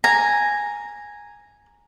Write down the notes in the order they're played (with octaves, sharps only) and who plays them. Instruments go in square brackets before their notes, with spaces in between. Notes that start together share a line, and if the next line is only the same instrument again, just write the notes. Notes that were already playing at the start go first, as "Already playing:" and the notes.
[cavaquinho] G#5 [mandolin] A#5